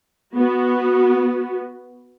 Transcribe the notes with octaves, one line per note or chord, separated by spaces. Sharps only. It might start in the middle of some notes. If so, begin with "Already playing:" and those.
B3 F#4